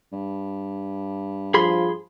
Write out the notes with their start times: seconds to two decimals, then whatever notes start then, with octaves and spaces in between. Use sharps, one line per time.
0.12 G2
1.54 F3 G#4 B5 C6